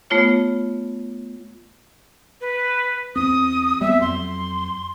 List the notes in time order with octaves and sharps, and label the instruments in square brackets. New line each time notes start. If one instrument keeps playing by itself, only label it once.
[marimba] A3 B3 F4 C#5
[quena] B4
[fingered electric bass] E2 C4 [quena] D#6
[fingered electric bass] G3 B3 C4 [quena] E5
[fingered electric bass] F2 F#3 [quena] C6